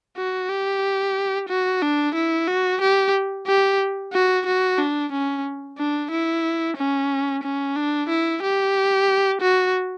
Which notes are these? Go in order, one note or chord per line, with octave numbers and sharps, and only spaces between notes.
F#4
G4
F#4
D4
E4
F#4
G4
G4
F#4
F#4
D4
C#4
D4
E4
C#4
C#4
D4
E4
G4
F#4